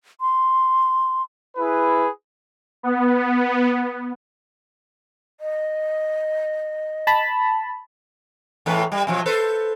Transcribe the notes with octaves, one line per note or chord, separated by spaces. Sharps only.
C6
E4 G#4 B4
B3
D#5
A5 B5
E2 A2 B4
G3
B2 F3 F#3
A4 B4 C5